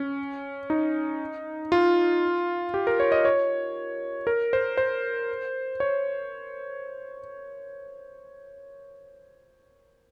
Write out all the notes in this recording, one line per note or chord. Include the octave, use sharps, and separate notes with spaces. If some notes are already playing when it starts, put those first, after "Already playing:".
Already playing: C#4
D#4
F4
G4
A#4
C#5
D#5
C#5
A#4
C5
C5
C#5